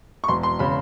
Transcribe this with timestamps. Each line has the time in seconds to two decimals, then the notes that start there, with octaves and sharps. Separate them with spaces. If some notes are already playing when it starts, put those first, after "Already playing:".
0.24 C#6
0.28 E1 C6
0.43 C6
0.59 C#3 B5